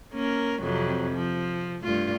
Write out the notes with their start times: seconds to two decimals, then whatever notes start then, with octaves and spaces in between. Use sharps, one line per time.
0.13 A#3 C#4 A#4
0.62 F2 C3 F#3
1.13 F3
1.83 G2 A3 F4